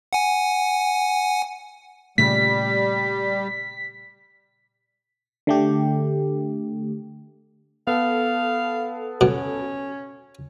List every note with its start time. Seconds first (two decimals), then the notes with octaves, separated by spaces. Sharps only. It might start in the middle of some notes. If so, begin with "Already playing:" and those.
0.13 F#5 G#5
2.18 A#2 C#3 G3 A3 B6
5.47 D3 A3 G4
7.87 B3 A4 F5
9.21 B2 C#4